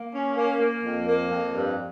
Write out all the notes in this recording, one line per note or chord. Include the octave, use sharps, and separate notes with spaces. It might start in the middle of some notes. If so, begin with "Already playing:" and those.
Already playing: A#3
C#4
A#3
A#3
F2
A#3
F2
G2